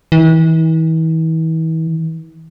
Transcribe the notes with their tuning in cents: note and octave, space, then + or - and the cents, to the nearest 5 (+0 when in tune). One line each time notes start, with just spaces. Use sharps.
E3 -40